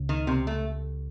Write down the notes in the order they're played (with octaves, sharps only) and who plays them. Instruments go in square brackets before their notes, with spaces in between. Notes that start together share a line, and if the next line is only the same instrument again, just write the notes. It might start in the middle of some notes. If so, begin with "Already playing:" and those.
Already playing: [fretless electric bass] C#2 C#3
[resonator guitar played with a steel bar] D#3
C3
A3